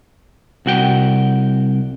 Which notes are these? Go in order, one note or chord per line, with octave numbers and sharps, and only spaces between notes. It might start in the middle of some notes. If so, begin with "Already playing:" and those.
C2 F#4 G5